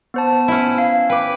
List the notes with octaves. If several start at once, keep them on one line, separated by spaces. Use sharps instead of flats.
B3 C5 A5
C#4 E4
F5
B4 G5 D6